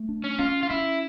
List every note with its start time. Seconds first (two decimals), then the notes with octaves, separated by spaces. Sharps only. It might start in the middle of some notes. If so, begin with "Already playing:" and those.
Already playing: A3
0.09 D4
0.24 C#4
0.39 C#4 F4
0.63 F4
0.70 C#4 E4